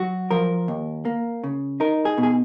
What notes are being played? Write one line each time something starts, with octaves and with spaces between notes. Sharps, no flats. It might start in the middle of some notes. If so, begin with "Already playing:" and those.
Already playing: F#3 F#4
F3 A#4
D#2
A#3
C#3
D#4 A#4
G#4
B2
G#4